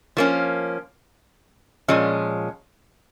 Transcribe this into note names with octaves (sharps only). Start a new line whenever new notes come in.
F3 A#3 C#4
A#2 F3 G#3 C#4